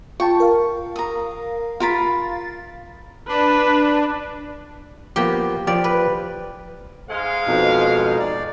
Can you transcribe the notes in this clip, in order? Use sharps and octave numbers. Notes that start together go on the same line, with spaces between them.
F4 G5 A5 C#6
A#4 F5
A#5 D#6
F4 A#4 F5 B5 A6
D4 B4
F3 A#3 B3 G4
F3 G4 D5
B4
G#2 G#3 F5
F2 B2 D#4
D5